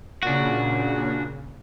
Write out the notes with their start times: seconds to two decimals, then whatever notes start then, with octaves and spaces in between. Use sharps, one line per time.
0.23 A#2 C#3 D4 F#4